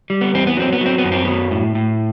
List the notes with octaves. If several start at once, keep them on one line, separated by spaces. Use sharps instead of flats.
G3
B3
E2 C4
B3
F#3 C4
B3
F#3
C4
B3
F#2
C4
F#3 B3
A2
A2